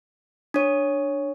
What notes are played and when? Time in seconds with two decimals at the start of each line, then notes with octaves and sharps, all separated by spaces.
0.54 D4 C#5